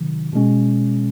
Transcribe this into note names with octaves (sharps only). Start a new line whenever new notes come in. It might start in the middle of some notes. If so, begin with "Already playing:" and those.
Already playing: C3 D#3 F#3
B2 G#3 C#4